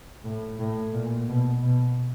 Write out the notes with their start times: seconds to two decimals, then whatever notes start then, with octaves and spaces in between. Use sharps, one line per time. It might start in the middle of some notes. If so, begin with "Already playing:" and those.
0.24 A2
0.59 A2
0.93 A#2
1.28 B2
1.62 B2